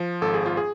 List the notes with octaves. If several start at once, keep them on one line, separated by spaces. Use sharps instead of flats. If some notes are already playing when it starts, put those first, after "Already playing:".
Already playing: F3
G#1 A4
G#4
F4
G#4